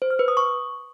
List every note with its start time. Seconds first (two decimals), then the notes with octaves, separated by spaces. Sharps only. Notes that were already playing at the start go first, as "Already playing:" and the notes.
0.02 C5
0.10 F6
0.19 B4
0.28 D#6
0.37 C#6